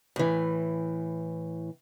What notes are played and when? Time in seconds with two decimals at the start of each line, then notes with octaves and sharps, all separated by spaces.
0.16 A2 E3